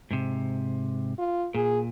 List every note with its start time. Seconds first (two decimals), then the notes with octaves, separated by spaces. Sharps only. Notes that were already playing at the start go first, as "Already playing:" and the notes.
0.11 G#2 C3
1.18 F4
1.55 A#2 G#4